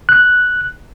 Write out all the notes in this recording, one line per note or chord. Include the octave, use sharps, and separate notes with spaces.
F#6